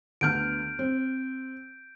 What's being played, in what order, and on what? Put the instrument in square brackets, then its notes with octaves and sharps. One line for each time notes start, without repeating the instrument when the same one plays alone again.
[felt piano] D2 B3 F6 [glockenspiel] G6 D7
[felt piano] C4